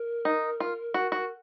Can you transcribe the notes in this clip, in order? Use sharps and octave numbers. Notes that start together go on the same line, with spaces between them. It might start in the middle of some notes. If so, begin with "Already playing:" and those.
Already playing: A#4
D#4
F4
F#4
F#4